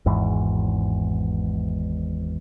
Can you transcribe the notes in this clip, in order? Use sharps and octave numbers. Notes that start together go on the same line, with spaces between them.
G#1 E2 G#2